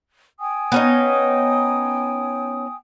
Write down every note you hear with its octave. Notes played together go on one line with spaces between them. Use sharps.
G5 G#5 D#6
B3 C#4 D#4